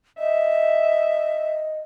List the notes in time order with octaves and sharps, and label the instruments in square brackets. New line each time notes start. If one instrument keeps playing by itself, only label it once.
[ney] D#5 [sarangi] E5